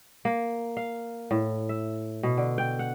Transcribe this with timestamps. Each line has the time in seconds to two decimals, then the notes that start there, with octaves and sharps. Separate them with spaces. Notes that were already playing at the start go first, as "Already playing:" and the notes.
0.25 A#3
0.77 F5
1.31 A2
1.69 E5
2.23 B2
2.37 D3
2.58 G5
2.79 F#5